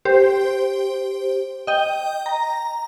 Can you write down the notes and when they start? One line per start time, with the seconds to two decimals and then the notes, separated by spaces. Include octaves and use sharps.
0.05 G4 C5
1.67 D#5 G5
2.26 A#5